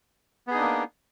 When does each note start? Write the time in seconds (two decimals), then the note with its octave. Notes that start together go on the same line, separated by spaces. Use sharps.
0.47 B3
0.51 G#4
0.54 D#4
0.58 D4
0.61 A#3